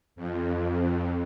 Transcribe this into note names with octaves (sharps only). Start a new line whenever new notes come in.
F2